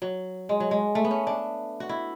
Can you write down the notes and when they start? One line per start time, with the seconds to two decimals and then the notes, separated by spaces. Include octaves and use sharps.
0.02 F#3
0.49 G#3
0.60 F#3
0.71 G#3
0.95 A3
1.05 B3
1.11 C#4
1.27 D4
1.80 F#4
1.89 E4